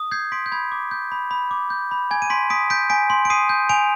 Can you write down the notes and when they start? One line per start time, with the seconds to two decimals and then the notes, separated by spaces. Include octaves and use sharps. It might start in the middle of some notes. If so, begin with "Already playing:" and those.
Already playing: D#6
0.11 G6 G#6 C7
0.32 C6 B6 D7
0.46 G6
0.52 B5 G#6
0.72 D6
0.91 G6
1.12 B5
1.31 B5
1.51 D6
1.70 G6
1.91 B5
2.11 G#5 G#6
2.22 D#7
2.30 C6 B6 D7
2.50 D#6 B6 D7
2.70 G6 B6 D7
2.90 G#5 B6 D7
3.10 C6
3.25 D7
3.30 D#6 C7 D#7
3.49 G6
3.69 G#5 D7 F7